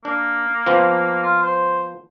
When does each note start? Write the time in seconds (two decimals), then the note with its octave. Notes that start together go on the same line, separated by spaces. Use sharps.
0.05 A#3 D4
0.66 F3 B3 C4
1.23 F4
1.43 C5